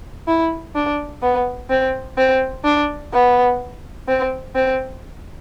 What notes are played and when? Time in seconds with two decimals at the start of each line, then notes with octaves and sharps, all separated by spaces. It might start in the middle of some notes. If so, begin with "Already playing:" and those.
0.27 E4
0.75 D4
1.22 B3
1.70 C4
2.18 C4
2.65 D4
3.13 B3
4.08 C4
4.55 C4